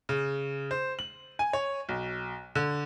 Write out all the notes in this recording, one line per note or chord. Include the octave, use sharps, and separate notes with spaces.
C#3
C5
F#7
G#5
C#5
B1
D3